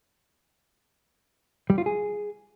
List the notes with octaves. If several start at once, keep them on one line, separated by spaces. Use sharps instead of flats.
G3
F4
G#4